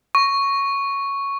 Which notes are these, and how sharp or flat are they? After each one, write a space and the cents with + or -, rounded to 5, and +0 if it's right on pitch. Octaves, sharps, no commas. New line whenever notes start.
C#6 +0